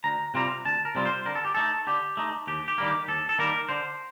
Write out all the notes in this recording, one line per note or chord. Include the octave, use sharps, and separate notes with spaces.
D2 A#5
C3 G3 C4 F4 A#5
D2 A5
A#4
C3 G3 C4 F4
C5
D3 A#4
A4
G4
A3 D#4 A4
D3 G4
A3 D#4
D#2 G4
G4
D#3 G3 A#3
G4
D#2 A4
A4
D#3 G3 A#3 A#4
D3 C5